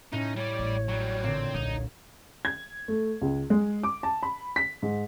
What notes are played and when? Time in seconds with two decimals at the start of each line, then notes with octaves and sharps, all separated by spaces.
0.13 A2 C#4 D#4
0.36 G3 C#5 D5
0.59 A1
0.88 F#3 G3
1.24 A#2 D3 C4
1.55 D#1 B1 D#4
2.45 G#6
2.88 A3
3.22 C#2
3.50 G#3
3.83 D6
4.03 A5
4.23 B5
4.56 B6
4.82 G#2